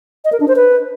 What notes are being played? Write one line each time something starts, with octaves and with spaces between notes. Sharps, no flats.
D#5
A#4
D4
C5
B4